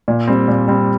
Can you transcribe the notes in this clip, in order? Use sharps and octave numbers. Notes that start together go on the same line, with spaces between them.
A#2
G3 C4
A#2
G3 C4